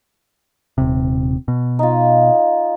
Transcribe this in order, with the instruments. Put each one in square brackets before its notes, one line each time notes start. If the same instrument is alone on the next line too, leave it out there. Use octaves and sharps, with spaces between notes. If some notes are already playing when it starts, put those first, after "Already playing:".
[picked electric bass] D#1 C3
B2
[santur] D#4 F4